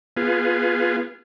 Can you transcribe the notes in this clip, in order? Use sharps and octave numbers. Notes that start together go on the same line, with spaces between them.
B3 F4 G#4